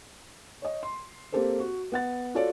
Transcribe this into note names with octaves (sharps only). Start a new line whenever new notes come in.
C#5 D#5
C6
A#3 C4 G4 A4 A#4 C5
F#4
B3 F#5 A6
F4 F#4 A4 C#5 D5